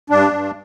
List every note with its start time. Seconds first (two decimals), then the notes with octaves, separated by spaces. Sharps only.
0.10 G2 D4
0.32 G2